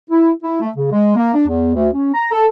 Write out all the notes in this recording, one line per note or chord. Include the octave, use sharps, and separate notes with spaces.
E4
E4
A3
C#3
G#3
A#3
D4
E2
D2
C#4
A#5
A4